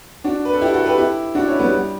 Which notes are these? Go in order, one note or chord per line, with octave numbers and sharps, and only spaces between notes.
D4 F#4
B4
A4
E4 G4
F#4 A4
G4 B4
E4 G4
D4 F#4
C#4 E4
G3 B3
G3